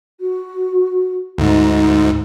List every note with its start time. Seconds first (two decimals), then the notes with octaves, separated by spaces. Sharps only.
0.20 F#4
1.38 D2 G#2 D#4